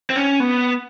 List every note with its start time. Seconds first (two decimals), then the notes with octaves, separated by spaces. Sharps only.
0.10 C4
0.16 C#4
0.40 B3